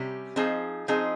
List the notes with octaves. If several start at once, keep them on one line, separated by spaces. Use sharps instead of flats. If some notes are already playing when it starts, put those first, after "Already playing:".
Already playing: C3 G3 C#4 G4
F3 C4 D#4 G#4
F3 C4 D#4 G#4